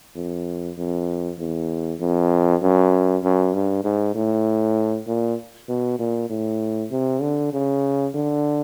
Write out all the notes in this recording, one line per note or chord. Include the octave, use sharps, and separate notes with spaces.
F2
F2
E2
F2
F#2
F#2
G2
G#2
A2
A#2
B2
A#2
A2
C3
D3
C#3
D3